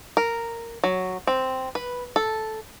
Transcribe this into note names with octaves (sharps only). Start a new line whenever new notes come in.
A#4
F#3
C4
B4
A4